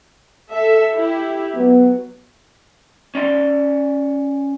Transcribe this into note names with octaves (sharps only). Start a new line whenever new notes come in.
A4 E5
E4 G4
F#3 B3
C#4 D5 C6